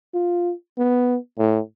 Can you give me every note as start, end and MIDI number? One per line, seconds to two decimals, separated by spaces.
0.14 0.53 65
0.78 1.17 59
1.38 1.60 45